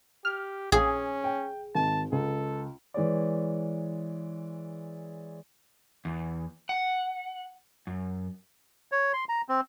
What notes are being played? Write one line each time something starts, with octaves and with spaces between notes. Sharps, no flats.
G4 F6
A#1 C#4 G#4
G5
G#1 A5
C#2 A4
E3 G#3 C#5 D5
E2
F#5
F#2
C#5
C6
A#5
C4